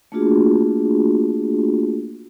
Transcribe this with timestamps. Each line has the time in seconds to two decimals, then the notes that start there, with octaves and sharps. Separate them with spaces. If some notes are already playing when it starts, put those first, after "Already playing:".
0.12 A3 A#3 D4 F4 F#4 G#4